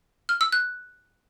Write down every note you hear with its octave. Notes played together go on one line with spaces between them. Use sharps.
F6
E6
F#6